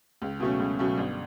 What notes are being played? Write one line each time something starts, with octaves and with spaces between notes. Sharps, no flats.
C#2
B2 F#3 A3 C#4
C#2
B2 F#3 A3 C#4
G1